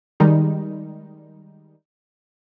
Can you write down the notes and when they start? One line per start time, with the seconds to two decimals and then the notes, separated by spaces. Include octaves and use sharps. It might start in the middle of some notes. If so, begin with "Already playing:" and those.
0.20 D#3 G3 G#3 D#4